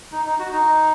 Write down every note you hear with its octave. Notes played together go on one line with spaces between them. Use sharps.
D#4
D#4
F#4
D#4